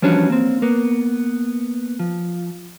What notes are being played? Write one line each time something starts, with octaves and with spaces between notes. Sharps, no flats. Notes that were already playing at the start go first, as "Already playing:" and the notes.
E3 F3 G3 C#4 D4 F#4
A#3 C4
A#3 B3
F3